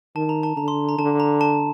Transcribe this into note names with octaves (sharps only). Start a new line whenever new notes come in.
D#3 A5
A#5
A5
D3 A#5
C6
A#5
D3 A5
A#5
A5